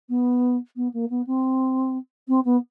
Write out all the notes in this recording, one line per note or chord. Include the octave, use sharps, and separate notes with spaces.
B3
B3
A#3
B3
C4
C4
B3